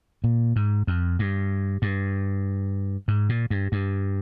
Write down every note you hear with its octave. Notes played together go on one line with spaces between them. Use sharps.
A#2
G#2
F2
G2
G2
G#2
A#2
G2
G2